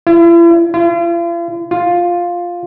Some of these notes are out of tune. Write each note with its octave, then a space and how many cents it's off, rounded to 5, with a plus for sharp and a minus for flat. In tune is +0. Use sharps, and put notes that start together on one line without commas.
E4 +40
F4 -45
F4 +5